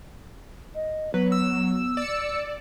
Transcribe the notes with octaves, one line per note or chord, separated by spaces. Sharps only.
D#5
F#3 B3 B4
E6
D5 E6 C#7